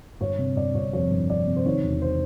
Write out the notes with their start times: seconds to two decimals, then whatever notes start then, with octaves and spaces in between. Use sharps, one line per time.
0.21 G1 C#5
0.39 C3
0.56 G1 D5
0.74 G1 C#5
0.93 F2 C#5
1.11 G1
1.29 F2 D5
1.47 C3
1.56 C5
1.66 D#3 C#5
1.83 E1
2.02 C5